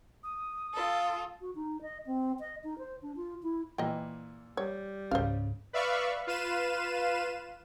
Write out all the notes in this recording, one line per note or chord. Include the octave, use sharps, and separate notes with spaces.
D#6
F4 A4
F#4
D#4
D#5
C4
D#5
D#4
C5
D4
F4
E4
A#2 E3 D#5 G5
G3 C#5
C#2 G#2 C#3 C5 F5
B4 D5 E5 F5 B5 C#6
F4 B4 F5 D#7 E7